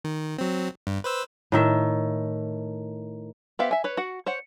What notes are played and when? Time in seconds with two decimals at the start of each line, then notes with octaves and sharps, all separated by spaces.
0.05 D#3
0.38 F#3 C4
0.87 G2
1.04 B4 C5 E6
1.52 A2 D#3 E5
3.59 B3 G4 C5 E5 F5
3.71 E5 G#5
3.84 B4 C#5
3.97 F#4 F#5
4.26 C5 C#5 F#5